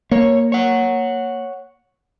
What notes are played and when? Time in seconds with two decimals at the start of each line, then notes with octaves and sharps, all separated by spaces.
0.11 A#3 C#5
0.52 C#5 F#5